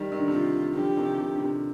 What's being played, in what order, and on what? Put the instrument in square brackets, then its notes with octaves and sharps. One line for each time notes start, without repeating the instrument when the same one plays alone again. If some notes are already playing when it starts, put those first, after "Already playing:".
Already playing: [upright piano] D#3 G3
D#3
D3
[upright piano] C3 D#3 [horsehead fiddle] F4
[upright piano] D3 F3 [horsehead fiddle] G4
[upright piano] C3 D#3
C3
D3
C3